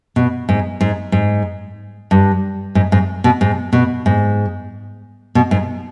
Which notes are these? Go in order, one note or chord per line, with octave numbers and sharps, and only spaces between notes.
B2
G#2
G#2
G#2
G2
G#2
G#2
B2
G#2
B2
G#2
B2
G#2